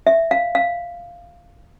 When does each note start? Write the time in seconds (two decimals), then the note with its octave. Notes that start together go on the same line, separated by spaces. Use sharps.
0.07 E5
0.31 F5
0.55 F5